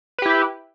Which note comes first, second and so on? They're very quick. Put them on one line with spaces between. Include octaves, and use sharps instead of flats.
B4 G4 E4